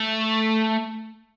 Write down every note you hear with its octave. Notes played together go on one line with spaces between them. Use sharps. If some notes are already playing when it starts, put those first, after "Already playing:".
Already playing: A3